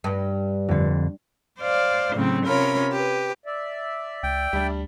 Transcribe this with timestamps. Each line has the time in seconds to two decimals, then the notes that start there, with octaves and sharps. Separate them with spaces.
0.04 G2
0.69 F2 D3
1.61 C5 D5 F5
2.15 A2 C#3 F#3 C4
2.46 C3 C#4 F4 A#4 C#5 B5
2.91 G4 B4
3.46 D5 E5
4.23 C#2 G5
4.53 D2 G3 D4